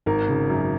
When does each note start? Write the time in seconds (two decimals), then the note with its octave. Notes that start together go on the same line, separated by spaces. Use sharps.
0.06 G#1 A#4
0.28 C#3
0.49 F#2